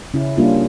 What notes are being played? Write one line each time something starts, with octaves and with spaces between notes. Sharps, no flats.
C#3 C#4 E4
G3 A#3 C#4 D4 F4